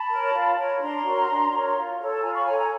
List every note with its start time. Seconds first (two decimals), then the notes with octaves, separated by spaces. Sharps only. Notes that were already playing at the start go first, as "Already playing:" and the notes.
Already playing: A5 B5
0.10 A#4 C#5
0.34 F4
0.57 A#4 C#5
0.81 D4 A#5 C6
1.04 F#4 A#4 C#5
1.29 D4
1.51 F#4 A#4 C#5
1.75 F4
2.00 A4 C#5
2.12 A5
2.22 F4 G#5 A#5
2.34 B5 C#6
2.46 A4 C#5 G#5 A#5
2.58 G#5 A#5